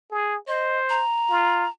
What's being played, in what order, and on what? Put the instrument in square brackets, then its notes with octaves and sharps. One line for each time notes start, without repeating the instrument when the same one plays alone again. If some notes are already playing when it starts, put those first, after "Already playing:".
[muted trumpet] G#4
[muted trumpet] C5 [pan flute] D#5
[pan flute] A#5
[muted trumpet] F4